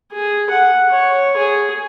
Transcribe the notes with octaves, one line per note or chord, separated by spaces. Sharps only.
G#4
F#5
C#5
G#4